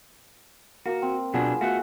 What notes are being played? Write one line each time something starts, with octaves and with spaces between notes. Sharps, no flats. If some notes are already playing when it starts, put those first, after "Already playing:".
A#3 F#4
C4
B2 F#3 B3 D4 F4 G#4
A3 F#4 F5 F#5